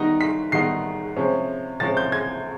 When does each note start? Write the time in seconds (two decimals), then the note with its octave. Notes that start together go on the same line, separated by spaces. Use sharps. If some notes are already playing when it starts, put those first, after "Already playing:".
Already playing: D#3 G3 B3 D#4 A#6
0.21 B6
0.52 D#3 G3 B3 D#4 C7
1.17 C3 F3 G#3 C#4
1.80 C3 F3 G#3 C#4 A6
1.97 G6
2.12 G#6